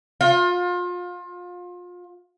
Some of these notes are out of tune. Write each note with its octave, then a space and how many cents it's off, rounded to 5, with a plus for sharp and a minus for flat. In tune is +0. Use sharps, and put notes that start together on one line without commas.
F4 +30